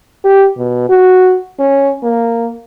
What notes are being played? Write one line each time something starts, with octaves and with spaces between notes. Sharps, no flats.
G4
B2
F#4
C#4
A#3